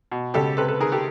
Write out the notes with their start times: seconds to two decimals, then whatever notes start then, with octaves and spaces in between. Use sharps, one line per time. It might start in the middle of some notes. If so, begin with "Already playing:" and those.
0.12 B2
0.34 C#2 G4 A4
0.57 C3 A4 B4
0.68 A4 B4
0.80 D#3 G#4 A#4
0.92 G4 A4